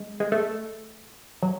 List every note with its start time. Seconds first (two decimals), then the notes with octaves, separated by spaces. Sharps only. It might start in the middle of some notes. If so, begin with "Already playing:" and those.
Already playing: G#3
0.20 G#3
0.32 A3
1.43 F#3